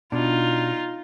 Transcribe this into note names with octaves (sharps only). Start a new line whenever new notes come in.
B2 D4 D#4 F4